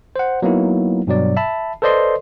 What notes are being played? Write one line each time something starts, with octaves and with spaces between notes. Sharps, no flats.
C5 F#5
F#3 A#3 B3 D#4 E4
G2 B2 F#3 D5
E5 A5 B5
A4 B4 C5 D5 D#5 C6